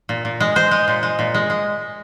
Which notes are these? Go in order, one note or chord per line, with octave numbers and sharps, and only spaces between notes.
A#2
A#2
G#3
G#3 C5
G#3
A#2
G#3
A#2
G#3
G#3